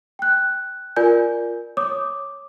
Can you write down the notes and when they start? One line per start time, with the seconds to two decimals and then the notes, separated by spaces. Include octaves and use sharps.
0.19 G5 F#6
0.96 F4 A#4 D5 G#5 G6
1.77 C#5 D6 D#6